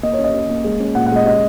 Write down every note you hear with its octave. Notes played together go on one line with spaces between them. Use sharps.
A#3 D#5
C#5
C#4
D#5
C#4
A#3
G#3
C#4
A#2 F#5
F#5
G#3 D#5
C#4 D#5